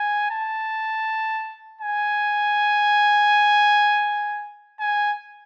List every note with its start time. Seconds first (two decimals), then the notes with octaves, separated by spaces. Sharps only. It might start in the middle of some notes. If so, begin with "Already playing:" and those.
Already playing: G#5
0.31 A5
1.81 G#5
4.80 G#5